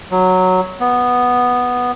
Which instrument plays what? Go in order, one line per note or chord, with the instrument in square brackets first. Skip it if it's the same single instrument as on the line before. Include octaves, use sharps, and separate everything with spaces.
[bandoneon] F#3
B3